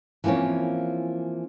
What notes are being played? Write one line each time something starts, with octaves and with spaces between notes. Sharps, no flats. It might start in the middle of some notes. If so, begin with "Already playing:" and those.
E3 F3 A#3 C4 C#4